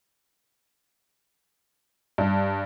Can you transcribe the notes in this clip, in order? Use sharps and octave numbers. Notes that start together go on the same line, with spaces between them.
G2